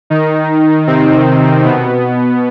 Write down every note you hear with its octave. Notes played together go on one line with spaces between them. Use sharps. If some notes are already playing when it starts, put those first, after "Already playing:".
D#3 D#4
C3 C4
B2 B3